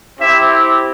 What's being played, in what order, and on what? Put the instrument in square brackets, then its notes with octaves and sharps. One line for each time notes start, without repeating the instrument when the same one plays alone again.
[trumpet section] C4 E4 G4 E5